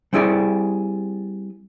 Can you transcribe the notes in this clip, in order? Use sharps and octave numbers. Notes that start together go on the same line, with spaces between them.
G3 C4 E4 G#4 D5